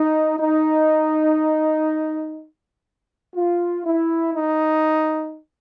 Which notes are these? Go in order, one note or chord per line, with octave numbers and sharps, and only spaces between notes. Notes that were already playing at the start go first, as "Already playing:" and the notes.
Already playing: D#4
D#4
F4
E4
D#4